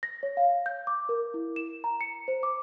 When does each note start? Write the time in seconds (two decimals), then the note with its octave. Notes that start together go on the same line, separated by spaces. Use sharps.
0.03 A#6
0.23 C#5
0.37 F5
0.66 G6
0.87 D6
1.09 A#4
1.34 E4
1.56 E7
1.84 A#5
2.01 C#7
2.28 C5
2.43 D6